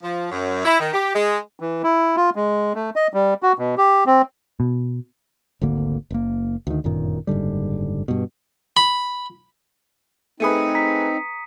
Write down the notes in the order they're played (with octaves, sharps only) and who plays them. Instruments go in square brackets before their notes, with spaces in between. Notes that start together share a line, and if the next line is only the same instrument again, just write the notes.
[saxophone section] F3
F#2
E4
D#3
G4
G#3
[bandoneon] E3
E4
F4
G#3
A3
D#5
G3
F#4
B2
G4
C4
[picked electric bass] B2
[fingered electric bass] G#1 D2 D3 A#3
F#1 A#3
D2 D#3
G1 F#2 A#2 D#3
F#1 G#2 D3 G3
G2 B2
[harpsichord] B5
[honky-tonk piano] A3 G#4 B4 [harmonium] C4 D#4 [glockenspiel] D#6 C#7 D#7
[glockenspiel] A#5 B6